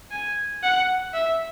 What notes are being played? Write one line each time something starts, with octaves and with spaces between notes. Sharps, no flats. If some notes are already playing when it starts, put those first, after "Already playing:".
G#5
F#5
E5